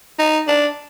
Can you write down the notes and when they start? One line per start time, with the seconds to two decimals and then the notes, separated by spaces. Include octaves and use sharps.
0.19 D#4
0.47 D4